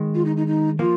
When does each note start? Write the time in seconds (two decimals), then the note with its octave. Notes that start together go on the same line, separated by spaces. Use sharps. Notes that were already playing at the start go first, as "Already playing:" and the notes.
Already playing: D#3 G#3
0.14 F4
0.25 D#4
0.36 D#4
0.46 D#4
0.79 F3 A#3 F4